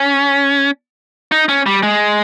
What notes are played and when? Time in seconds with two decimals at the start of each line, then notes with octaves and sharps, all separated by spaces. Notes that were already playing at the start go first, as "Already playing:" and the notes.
Already playing: C#4
1.32 D#4
1.49 C#4
1.66 G3
1.83 G#3